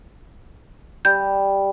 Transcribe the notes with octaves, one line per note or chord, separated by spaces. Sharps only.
G3 G6